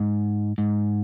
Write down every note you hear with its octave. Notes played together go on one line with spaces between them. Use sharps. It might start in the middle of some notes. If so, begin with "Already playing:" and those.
Already playing: G#2
G#2